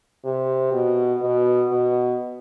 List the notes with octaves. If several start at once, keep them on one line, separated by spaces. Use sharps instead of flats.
C3
B2
B2
B2